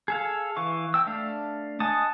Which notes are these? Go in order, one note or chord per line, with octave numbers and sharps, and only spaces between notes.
G#4 A4 F5
E3 F5 C#6
G5 E6
A3 D4 F5
D#5 F#5 G#5 A5 D#6